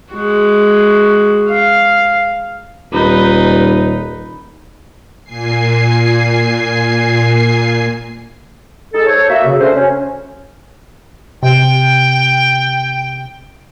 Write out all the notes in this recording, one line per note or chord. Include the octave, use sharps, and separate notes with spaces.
G#3 F#4
F5
D#1 D#4 B4
A#2 G#5 C7
G#3 D#4 G#4 A4
A4 C5 C#5
A#3 F#4 E5
C#3
D3 A3 C#4 F#4 C5
C#4
C3 G5